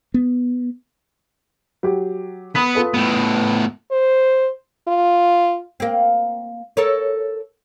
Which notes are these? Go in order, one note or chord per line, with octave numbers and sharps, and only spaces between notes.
B3
F#3 G4
B3 B5 D#6 B6
F4 A4 B4
A2 B3
C5
F4
A#3 C4
A4 A#4 C#5